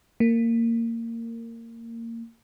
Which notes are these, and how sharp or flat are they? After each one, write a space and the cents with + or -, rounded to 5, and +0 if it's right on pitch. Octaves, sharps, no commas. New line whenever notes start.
A#3 -20